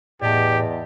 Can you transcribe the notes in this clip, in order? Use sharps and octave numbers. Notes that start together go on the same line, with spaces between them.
E2 A2 G4 D5 D#5 A5